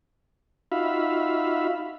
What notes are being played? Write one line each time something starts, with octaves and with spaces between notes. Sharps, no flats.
D#4 F4 F#4 E5 F5 B5